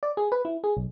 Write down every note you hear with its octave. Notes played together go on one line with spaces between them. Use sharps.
D5
G#4
B4
E4
G#4
B1